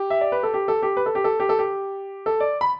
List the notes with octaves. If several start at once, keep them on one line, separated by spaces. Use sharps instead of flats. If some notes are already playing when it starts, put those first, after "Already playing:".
Already playing: G4
E5
D5
B4
A4
G4
A4
G4
B4
A4
G4
A4
G4
A4
G4
A4
D5
B5